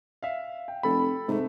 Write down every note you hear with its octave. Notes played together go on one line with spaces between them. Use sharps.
E5 F5
G5
F1 A4 B5
G#2 C3 A3